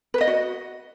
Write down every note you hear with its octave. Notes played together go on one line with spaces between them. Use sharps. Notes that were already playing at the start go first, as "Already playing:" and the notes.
B4
D#5
F#4